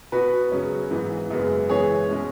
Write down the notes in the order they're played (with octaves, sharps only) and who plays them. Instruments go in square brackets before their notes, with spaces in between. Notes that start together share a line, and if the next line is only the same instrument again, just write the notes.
[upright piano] B2 B3 F#4 B4
C#3 F#3 C#4
G#2 E3 B3
F#2 C#3 G#3 B3
C#3 E3 G#3 B3 G#4 C#5
B2 G#3 C#4